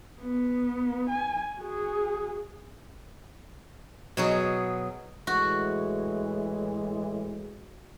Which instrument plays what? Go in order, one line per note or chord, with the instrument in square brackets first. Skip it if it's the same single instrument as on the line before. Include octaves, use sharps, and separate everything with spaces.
[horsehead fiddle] B3
G#5
F#4 G#4
[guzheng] B2 F#3 G#4
[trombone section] A2 E3 G#3 [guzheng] F#4